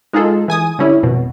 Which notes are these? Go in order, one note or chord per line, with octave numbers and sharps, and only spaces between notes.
G#3 D#4 F4 G#4 A4
E3 G#5 D#6
D3 G3 C#4 E4
G#1 F2 B2